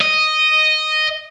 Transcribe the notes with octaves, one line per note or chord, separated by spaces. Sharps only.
D#5